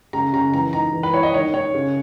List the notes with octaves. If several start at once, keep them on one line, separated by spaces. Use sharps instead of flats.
C#3 A#5
C#3 A#5
E3 A#5
D#4 A#5
E3
B4
E4 C#5
D#5
D#3 C#5
D#4 C#5
C#3